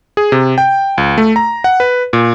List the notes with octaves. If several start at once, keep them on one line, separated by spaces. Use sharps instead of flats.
G#4
C3
G5
C#2
A3
A#5
F#5
B4
A#2